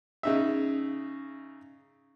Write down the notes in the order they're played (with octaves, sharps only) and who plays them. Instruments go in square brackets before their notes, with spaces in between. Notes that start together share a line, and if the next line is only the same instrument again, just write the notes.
[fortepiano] C#3 D#4 E5